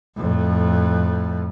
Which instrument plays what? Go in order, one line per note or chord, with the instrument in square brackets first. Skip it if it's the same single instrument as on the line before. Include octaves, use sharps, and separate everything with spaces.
[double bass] F2 A2